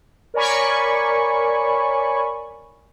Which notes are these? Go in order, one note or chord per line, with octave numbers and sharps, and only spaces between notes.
A#4 C#5 D5 G#5 B5 C#6